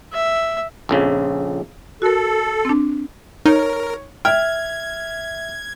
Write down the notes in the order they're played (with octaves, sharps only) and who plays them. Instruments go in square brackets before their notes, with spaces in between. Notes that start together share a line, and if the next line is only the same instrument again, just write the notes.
[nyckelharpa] E5
[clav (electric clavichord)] A#1 F2 C#3
[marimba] F#4 A#4 [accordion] A4
[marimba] C4 D4
[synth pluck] D#4 [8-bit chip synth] A#4 [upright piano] C#5
[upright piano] E5 F6 [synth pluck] G5 [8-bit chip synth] G#6